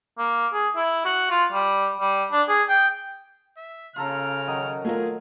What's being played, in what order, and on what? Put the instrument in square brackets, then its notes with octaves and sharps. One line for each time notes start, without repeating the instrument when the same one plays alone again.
[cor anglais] A#3
G#4
E4
F#4
F4
G3
G3
D4
G#4
G5
[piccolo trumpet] E5
[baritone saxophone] C#3 [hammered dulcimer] F4 A4 A#5 [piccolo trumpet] F6
[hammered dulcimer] D#3 F#3 D#5
[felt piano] A3 F4 A#4 [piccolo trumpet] G#4